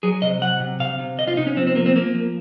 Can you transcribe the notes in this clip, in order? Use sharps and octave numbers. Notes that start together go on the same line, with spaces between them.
F#3 G#4
C3 D#5
F#3 F#5
C3
C3 F5
C3
C3 D#5
F4
C3 D#4
C#4
F3 C4
C4
F3 A#3
C4
F3 A#3
F3